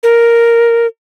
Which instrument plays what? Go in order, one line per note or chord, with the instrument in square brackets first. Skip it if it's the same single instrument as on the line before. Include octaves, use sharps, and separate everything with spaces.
[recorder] A#4